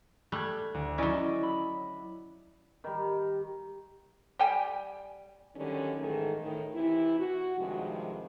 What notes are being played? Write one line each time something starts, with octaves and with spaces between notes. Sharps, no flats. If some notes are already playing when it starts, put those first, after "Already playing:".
G3 A3 F#6 G#6
D2
F#3 C#4 E4 D5 D#5
B5
D#3 G3
G3 G5 G#5
D3 D#3 F#3 G3 C#4
G#2 D#3 E3 A3 G#4
A2 D#3
C3 E3 E4
F#4
G2 C3 D#3 F3 G#3